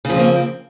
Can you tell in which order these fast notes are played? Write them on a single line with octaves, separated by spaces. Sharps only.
C#3 F3 C4 A#3